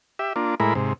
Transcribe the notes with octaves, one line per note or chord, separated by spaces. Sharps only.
G4 E5
A#3 D4 F4
A2 G#3 E4 A#4 B5
G#2 C3